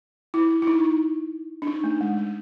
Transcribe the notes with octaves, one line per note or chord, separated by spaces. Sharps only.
E4
E4
D#4
D4
D#4
A3
G#3
G#3